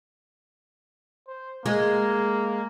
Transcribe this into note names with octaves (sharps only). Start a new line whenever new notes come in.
C5
G#3 A#3